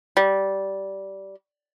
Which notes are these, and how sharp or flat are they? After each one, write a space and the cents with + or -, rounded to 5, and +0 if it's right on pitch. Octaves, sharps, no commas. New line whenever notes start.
G3 -15